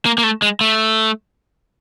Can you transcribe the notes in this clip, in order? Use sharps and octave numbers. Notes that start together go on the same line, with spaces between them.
A#3
A#3
A3
G#3
A3